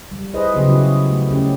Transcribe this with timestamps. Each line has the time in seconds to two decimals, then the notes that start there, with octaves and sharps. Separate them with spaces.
0.12 G3
0.34 E4 G#4 B4 C5 D#5
0.54 C#3 F#3 B3 G4 G#4
0.69 E4 F#4 G#4
1.09 A3
1.29 A3 C#4 G4